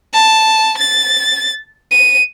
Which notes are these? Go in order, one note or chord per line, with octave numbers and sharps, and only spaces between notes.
A5
A6
D#7